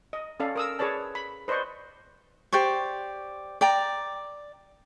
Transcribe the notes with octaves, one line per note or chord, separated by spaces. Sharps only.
D#5
C#4 A4 D5 F5
A#4 D#6 E6
G#4 B4 C#5 D5 A5
B5
B4 C5 D5 D#5 C#6
G4 C5 D5 C#6
D5 G5 A#5